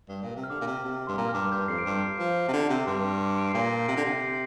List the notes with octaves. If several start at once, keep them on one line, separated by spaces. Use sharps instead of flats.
G2
A#2
C3
F6
D3 D6
A#2
C3
C3
G2 C6
A#2 A#5
F6
G2 D6
G2 G6
F2 C7
D7
G2 G6 C7
F3
C3
D3
G6
C3
D6
G2 C6
C6
D6
C6
D7
C7
A#2
A#6
G6 C7
C3 A#6 D7
D3
A#6
C3 G6 C7
G6 C7